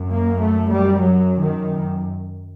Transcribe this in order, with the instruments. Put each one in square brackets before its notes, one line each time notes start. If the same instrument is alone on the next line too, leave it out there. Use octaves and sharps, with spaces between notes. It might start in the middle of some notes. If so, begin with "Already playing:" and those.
Already playing: [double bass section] F#2
A#3
A3
G3
F#3
D#3